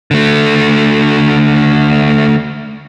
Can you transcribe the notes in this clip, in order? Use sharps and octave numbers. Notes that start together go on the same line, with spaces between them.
D3 A3